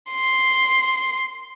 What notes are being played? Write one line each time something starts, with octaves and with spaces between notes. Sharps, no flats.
C6